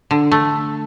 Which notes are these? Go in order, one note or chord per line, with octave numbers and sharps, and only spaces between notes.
D3
A3